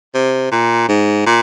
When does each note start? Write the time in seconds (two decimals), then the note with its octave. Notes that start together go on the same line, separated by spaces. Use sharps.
0.14 C3
0.51 A#2
0.89 G#2
1.26 A#2